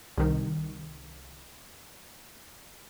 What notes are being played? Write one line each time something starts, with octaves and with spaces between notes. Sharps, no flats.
C2 D#3